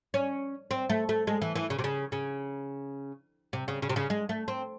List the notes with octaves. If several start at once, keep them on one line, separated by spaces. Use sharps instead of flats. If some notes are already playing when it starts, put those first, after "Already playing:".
C#4
C4
A3
A3
G#3
E3
E3
C#3
C3
C#3
C#3
C3
C#3
C#3
C3
C#3
G#3
A3
C4